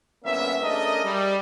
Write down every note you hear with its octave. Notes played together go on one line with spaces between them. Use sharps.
G1 C2 A#3 B3 C#4 E5
A3 C#4 D4 G#4 A#4 D#5
G3